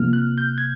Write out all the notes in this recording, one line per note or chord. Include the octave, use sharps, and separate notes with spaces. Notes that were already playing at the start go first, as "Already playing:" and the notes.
Already playing: C3 F3 A#3 F6
F#6
G6
G#6